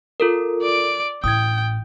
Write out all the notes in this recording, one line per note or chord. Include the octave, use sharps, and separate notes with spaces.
F4 A4 A#4
D5 D7
A1 G5 D#6 G#6